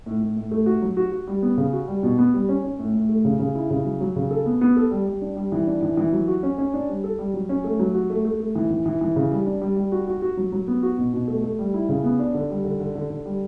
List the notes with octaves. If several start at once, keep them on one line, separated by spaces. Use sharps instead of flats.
A2
A2
A2
A3
F#4
F#3
F#4
F#4
G3
B3
C#3
F#4
G3
B2
B3
G3
C#4
C#4
A2
A2
A3
C#3
C#3
E4
C#3
F#3
F#3
C#3
A4
B3
B3
A4
G3
G3
D4
G3
E3
D4
E3
E3
F#3
F#4
C#4
C#4
D4
G3
A4
G3
F#3
C#4
A3
F#3
F#4
A3
A3
A3
E3
E3
E3
E3
C#3
G3
D4
G3
G3
F#4
F#4
F#4
F#3
F#3
B3
F#4
B2
B2
A3
A3
G3
E4
C#3
B3
D4
D3
G3
D3
D3
D3
D3
G3